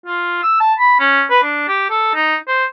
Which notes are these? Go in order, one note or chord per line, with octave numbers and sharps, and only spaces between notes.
F4
E6
A5
B5
C#4
B4
D4
G4
A4
D#4
C5